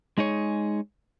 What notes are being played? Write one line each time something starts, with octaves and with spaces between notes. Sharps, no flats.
G#3 D#4 G#4 C#5